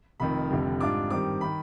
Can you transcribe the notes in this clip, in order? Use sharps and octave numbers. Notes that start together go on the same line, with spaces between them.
F1 F2 D#3 B5
F1 F2 D3 G3
G#2 G3 D4 F4 D6
G2 D#3 G3 C4 D6
D#3 B5